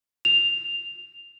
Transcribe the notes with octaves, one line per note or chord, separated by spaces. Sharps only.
F7